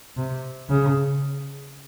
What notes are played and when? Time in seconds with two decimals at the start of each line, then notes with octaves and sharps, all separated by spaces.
0.17 C3
0.70 C#3